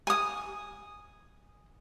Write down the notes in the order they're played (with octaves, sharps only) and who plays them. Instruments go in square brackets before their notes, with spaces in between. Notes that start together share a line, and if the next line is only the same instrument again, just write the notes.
[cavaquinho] G#5 D#6